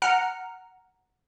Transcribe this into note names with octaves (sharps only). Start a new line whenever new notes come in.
F#5 A#5 F6